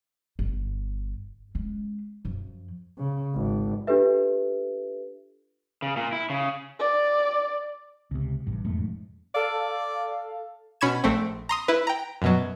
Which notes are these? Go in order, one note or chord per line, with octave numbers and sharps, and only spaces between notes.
G1
G#3 C#4
F#2 F3
C#3
G#1
D4 F4 G4 A4 B4 E5
C#3
A#2
E4
C#3
D5
C#2 C3
A1 G2
E1 F2 G#2 A3
A4 D5 F5
B2 C#4 B5 C#6 G#6 E7
A#1 A3 C4
A#5 C6 D#6
E4 B4
G5 A#5
F#2 B2 F#3